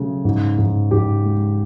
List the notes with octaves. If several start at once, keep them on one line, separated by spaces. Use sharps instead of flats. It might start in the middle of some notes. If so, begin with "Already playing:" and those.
Already playing: C#3 F#3 A3
G#2
G#2
G#2 G4
G#3